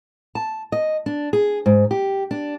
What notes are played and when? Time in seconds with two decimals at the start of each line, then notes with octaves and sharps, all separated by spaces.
0.35 A5
0.72 D#5
1.06 D4
1.33 G#4
1.66 G#2
1.91 G4
2.31 D4